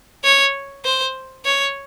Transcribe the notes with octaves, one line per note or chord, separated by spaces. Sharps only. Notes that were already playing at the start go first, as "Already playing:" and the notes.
C#5
C5
C#5